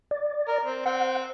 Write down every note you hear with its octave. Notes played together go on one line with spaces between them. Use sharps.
D5
A#4
C4
C4 F#5